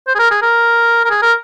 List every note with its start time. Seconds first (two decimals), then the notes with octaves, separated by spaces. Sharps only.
0.07 C5
0.15 G#4
0.19 A#4
0.31 G#4
0.42 A#4
1.04 A#4
1.10 G#4
1.22 A#4